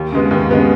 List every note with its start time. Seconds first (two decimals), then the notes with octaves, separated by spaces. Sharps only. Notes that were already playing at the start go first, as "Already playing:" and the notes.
Already playing: D#2
0.12 C#3 G#3 B3
0.31 D#2
0.50 C#3 G#3 B3